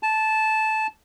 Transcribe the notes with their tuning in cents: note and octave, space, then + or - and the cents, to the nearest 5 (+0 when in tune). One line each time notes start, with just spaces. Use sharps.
A5 -10